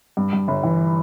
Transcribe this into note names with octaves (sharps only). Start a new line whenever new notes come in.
G2
G2
G1
E3